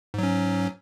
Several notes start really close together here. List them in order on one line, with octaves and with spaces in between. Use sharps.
G#2 F#3 C#4